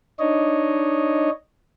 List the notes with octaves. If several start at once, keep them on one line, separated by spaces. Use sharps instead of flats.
D4 D#4 C#5 D#5